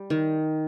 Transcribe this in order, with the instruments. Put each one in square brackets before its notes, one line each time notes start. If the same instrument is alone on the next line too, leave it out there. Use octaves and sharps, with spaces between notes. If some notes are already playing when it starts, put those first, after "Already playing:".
Already playing: [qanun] G3
D#3